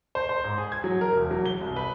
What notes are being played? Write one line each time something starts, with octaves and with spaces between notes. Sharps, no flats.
C5
C5
G#2
G#4
G#6
F#3
A#4
E1
F#3
G7
C2
B4